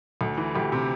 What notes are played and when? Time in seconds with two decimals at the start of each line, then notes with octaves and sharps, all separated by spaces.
0.21 D2 A4
0.38 E3
0.54 D2 G4
0.72 C3